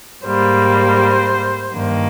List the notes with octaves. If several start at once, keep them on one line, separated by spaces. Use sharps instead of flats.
G#2 G3 A#3 C5
G2 D#3 A#3